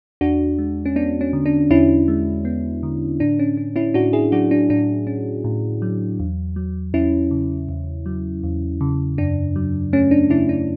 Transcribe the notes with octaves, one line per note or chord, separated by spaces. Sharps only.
E2 D4 F#4
G#3
C#4
B3 D4
C#4
D3
D4
E2 C#4 E4
G#3
B3
D3
A2 D4
C#4
C#4
C#4 E4
A2 D4 F#4
E4 G#4
F#3 D4 F#4
D4
A2 D4
C#4
A2
F#3
E2
F#3
E2 C#4 E4
C#3
E2
F#3
E2
C#3
F#2 D4
F#3
A3 C#4
D4
C#3 C#4 E4
D4